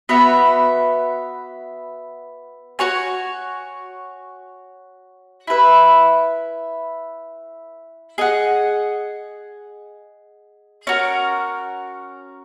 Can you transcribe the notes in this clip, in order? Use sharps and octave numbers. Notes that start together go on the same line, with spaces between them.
B3 F#4 B4 E5
F#4 C#5 G#5
E4 B4 E5
G#4 D#5 F#5
C#4 F#4 A#4